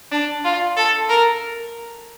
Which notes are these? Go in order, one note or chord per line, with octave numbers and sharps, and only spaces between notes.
D4
F4
A4
A#4